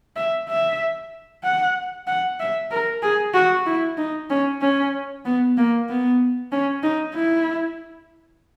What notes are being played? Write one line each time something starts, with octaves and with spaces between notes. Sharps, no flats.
E5
E5
F#5
F#5
E5
A#4
G#4
F#4
E4
D#4
C#4
C#4
B3
A#3
B3
C#4
D#4
E4